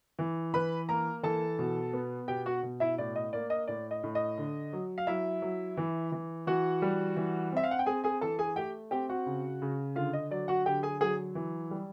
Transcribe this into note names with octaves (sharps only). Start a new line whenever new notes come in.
E3
E3 B4 B5
A#3 A#4 A#5
E3 A4 A5
B2
B3
B2 G4 G5
F#4 F#5
B2
E4 E5
A2 D5
D#5
A#3 D5
D#5
A2 D5
D#5
A2
D#5
D3
F#3
F5
F#3 E4 E5
F#3
E3
E3
E3 F#4 F#5
G3
E3
C4 E5
F5
F#5
G5
C4 G#4 G#5
G#4 G#5
E3 A4 A5
G#4 G#5
A3 G4 G5
C4 G4 G5
F#4 F#5
C#3
C#3
D3 F4 F5
D#5
F#3 D5
F#4 F#5
D3 G4 G5
G#4 G#5
F#3 G#4 G#5
E3
G3